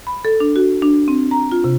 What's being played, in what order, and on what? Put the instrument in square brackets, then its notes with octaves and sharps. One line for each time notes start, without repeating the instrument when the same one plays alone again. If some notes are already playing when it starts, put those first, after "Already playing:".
[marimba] B5
A4
D4
F#4
D4
C4
A#5
F4
C3